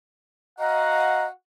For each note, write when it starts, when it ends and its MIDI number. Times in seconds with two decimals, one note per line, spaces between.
0.58 1.29 66
0.58 1.25 75
0.58 1.29 77
0.58 1.29 78
0.58 1.25 82